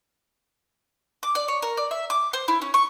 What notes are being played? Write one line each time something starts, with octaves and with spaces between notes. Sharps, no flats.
D6
D5
C#5
A#4
D5
E5
D6
C5
E4
C#4
C#6